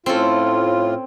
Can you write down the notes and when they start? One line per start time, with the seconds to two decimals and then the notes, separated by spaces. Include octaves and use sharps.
0.06 A2 C4 C#4 F4 A4